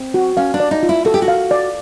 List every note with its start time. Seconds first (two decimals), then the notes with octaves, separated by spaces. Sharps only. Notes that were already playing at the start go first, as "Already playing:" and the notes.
Already playing: C4
0.14 F#4
0.37 C#4 F5
0.54 D4
0.60 D5
0.71 D#4
0.83 F4
0.89 E4
1.05 F#4 A4
1.14 G4
1.22 F#4
1.28 F5
1.51 D5